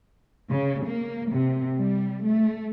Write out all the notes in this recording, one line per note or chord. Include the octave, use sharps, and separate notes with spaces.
C#3
A#3
C3
G3
A3